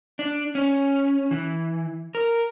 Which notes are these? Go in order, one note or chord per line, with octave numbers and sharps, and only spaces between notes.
D4
C#4
E3
A#4